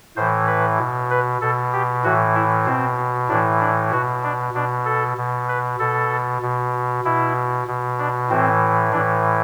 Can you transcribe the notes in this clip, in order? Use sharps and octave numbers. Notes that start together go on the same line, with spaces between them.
A2 E3 C5
B4
B2
B4
B2 A4
G4
A2 E3 F#4
E4
B2 C4
A2 E3 D4
D4
B2 F#4
D4
B2 D4
A4
B2
B4
B2 A4
B2
B2 E4
B2
D4
A2 E3 C4
A2 E3 D4